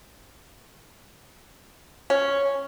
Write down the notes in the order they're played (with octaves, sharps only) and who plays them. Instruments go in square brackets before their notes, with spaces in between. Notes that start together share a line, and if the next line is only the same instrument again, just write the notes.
[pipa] C#4